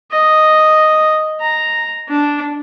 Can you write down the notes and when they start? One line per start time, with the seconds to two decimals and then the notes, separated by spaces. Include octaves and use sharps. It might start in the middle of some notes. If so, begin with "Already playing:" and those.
0.12 D#5
1.40 A#5
2.09 D4